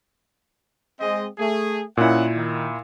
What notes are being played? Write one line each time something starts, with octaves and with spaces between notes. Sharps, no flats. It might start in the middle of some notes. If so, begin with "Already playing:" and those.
G#3 C4 D#5
A3 G#4
A#2 C#4 E4 D#5 F#5
D#3